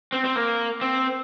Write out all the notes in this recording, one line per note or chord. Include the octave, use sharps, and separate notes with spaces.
C4
C4
A#3
C4